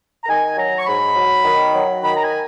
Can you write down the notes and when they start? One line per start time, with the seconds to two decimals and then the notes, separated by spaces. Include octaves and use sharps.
0.24 A#5
0.28 D#3 G#5
0.57 F#3 A#5
0.78 C#6
0.86 G#2 B5
1.15 F#3
1.44 D#3
1.73 F#3
2.03 D#3 B5
2.15 A#5
2.22 G#5